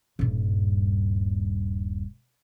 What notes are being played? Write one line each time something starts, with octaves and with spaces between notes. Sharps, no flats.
D#1 G2